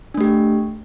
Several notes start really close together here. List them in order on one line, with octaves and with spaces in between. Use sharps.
D4 A3 G4